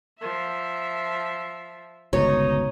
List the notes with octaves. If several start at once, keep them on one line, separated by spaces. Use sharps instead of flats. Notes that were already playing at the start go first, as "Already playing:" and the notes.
F3 E5
G1 C#2 B2 D#4 C#5